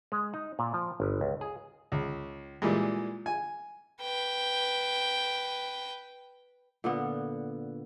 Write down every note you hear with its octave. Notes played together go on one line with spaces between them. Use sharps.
G#3
D#4
A#2
F3
G1
C#2
G#4
C#2
A#2 E3 G3 G#3
G#5
B4 G5
A#2 D3 B3